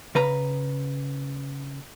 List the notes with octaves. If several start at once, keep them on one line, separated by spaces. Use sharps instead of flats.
C#3 B4 A#5